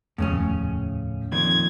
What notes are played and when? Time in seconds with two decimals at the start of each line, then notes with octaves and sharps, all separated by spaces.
0.18 D#1 F2 A2 C#3 A3 C#4
1.32 F2 A#2 D#3 G#6